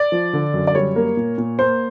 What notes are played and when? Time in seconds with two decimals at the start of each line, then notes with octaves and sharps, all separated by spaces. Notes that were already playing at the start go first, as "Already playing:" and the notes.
Already playing: D5
0.12 F3
0.33 D3
0.54 F#2
0.67 D5
0.75 G3 C#5
0.96 A#3
1.17 A#2
1.38 A#2
1.58 A#3 C5